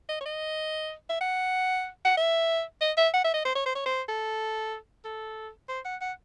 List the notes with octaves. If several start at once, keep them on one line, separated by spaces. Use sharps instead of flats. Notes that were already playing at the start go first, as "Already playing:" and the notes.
D#5
C#5
D#5
E5
F#5
F#5
E5
D#5
E5
F#5
E5
D#5
C5
C#5
C5
C#5
C5
A4
A4
C5
F#5
F#5